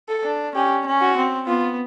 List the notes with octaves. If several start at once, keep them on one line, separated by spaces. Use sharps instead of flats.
A4
D4
C#4 G4
C#4
F#4
C4
B3 F4